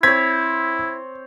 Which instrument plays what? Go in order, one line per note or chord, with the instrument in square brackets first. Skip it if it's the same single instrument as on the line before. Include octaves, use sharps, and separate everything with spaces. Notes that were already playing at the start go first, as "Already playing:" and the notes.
[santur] C4 C#5 [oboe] E4 [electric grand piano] G#6 [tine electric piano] B6